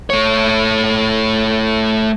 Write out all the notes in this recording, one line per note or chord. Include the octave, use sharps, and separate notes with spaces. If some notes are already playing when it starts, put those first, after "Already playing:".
A3 C#5